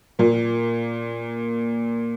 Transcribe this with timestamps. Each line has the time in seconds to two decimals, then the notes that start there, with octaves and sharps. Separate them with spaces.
0.19 A#2 A#3